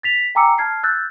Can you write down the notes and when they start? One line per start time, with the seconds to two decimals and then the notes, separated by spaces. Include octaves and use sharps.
0.03 A6 B6 F7
0.35 G5 G#5 A#5 D6 E6 C#7
0.58 A5 F6 G#6 C7
0.83 E6 F#6 G6 A6